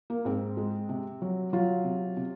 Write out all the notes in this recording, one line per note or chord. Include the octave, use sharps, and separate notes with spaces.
A#3
G#2 C4
G#3
C3
F#3
F#3 F4
C3
C3